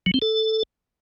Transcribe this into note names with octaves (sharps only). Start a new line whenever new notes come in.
F#3
C4
A4